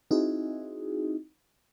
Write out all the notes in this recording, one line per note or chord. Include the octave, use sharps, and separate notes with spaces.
C4 D#4 E4 F#4 G#4